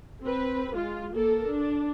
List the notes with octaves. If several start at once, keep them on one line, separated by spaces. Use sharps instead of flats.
C4 B4
G#3 F4
A#3 A4 A#4
D4